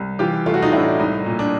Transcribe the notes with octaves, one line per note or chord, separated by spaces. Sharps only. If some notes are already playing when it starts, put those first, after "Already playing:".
Already playing: C2
E3 F4 G4
A3 F4
F#4
D#4 F4
A2 D4 E4
C2 D#4
A#2
D4